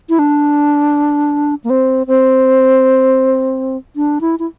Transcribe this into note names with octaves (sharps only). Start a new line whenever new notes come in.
E4
D4
A#3
C4
C4
D4
E4
E4